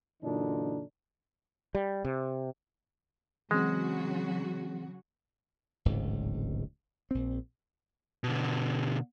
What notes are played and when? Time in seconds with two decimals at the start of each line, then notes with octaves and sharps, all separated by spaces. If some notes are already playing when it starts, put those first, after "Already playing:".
0.22 F#2 A#2 D3 E3 D4 D#4
1.75 G3
2.04 C3
3.51 C#3 E3 F#3 G#3 C4 F#4
5.85 D1 G#1 C#2 G#2
7.11 A#1 C4
8.24 B2 D3